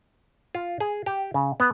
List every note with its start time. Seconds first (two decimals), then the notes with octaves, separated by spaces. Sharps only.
0.55 F4
0.80 G#4
1.06 G4
1.34 C#3
1.60 B3